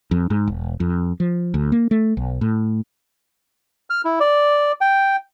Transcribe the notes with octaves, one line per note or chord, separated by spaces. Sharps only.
F2
G#2
E1
F2
F3
D2
A#3
A3
B1
A2
F6
E4
D5
G5